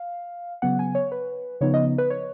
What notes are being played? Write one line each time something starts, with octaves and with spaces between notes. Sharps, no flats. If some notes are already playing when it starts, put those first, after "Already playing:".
Already playing: F5
C#3 F#3 B3 F#5
G#5
C#5
B4
C#3 F3 B3 D#4 C#5
D#5
B4
C#5